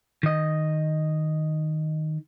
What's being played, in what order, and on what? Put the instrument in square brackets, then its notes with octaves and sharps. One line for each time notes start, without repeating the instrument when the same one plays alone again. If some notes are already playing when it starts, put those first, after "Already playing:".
[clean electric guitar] D#3 D#5